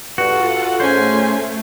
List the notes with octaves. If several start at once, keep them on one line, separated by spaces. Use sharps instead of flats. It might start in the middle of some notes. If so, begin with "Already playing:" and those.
G2 F4 F#4 A4 F#5
G#2 A3 C#4 C5 C#5 G#5